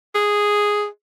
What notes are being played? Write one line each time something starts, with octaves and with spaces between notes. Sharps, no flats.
G#4